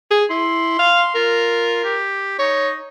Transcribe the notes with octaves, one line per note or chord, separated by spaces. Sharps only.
G#4
E4 C6
F5
F4 A#4
G4
D#4 C#5